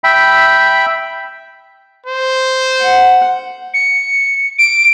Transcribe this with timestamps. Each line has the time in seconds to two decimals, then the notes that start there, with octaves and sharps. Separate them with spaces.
0.04 E5 G5 B5
2.06 C5
2.82 F#5
3.74 C#7
4.58 D7